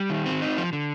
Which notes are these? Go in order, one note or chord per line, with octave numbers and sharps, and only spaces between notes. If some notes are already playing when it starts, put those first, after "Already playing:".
Already playing: G3
D#3
C4
D#4
F3
D3